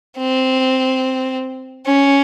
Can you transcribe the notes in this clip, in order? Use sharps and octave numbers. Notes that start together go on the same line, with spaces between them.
C4
C#4